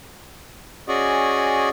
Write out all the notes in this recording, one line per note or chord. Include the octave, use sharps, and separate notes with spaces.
C#4 F#4 G#4 D5 D#5